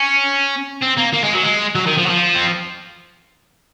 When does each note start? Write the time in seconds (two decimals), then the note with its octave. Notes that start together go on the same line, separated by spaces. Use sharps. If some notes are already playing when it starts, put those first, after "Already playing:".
Already playing: C#4
0.82 C4
0.98 A#3
1.14 A#3
1.24 G#3
1.33 F#3
1.43 G#3
1.75 F#3
1.87 D#3
1.98 F3
2.06 F#3
2.10 F3
2.35 C4